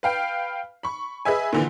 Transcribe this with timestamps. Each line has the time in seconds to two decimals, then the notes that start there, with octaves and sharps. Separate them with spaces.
0.03 B4 F5 G5
0.83 B5 C#6
1.25 G#4 B4 D#5 E5 G#5
1.53 A#2 D3 E3